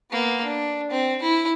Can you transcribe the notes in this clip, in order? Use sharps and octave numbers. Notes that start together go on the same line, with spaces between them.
A#3 B3
D4
C4
E4